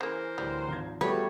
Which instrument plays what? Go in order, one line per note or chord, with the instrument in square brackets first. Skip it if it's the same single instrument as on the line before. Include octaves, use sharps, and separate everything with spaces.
[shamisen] C#3 A#3 [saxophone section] E3 A#4 C5
[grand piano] D2 A2 [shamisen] G3
[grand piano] G#1 F3 G#6
[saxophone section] E2 [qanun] G3 A3 C#5 [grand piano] F#4 [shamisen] B4